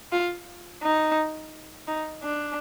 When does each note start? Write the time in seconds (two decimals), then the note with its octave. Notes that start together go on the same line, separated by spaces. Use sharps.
0.12 F4
0.83 D#4
1.88 D#4
2.23 D4